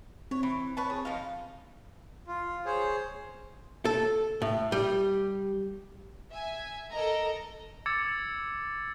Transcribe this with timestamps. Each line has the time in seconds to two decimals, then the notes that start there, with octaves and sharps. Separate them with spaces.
0.31 C4 C#5
0.43 E3
0.77 B4 C#5 A5
0.90 G#4
1.05 F3 D#4 F5
2.27 F4
2.66 G#4 C5 C#5
3.85 A4
4.42 A2
4.72 G3
6.31 E5 G#5
6.92 A4 A#4 D#5 A#5
7.86 D6 E6 G#6 A6 C#7